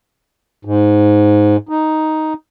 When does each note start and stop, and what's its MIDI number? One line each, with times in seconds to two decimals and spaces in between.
0.65 1.57 44
1.69 2.33 63